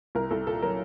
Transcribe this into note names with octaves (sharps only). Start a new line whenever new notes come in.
C2 A#4
C2 A4
A#2 A4
F#3 A#4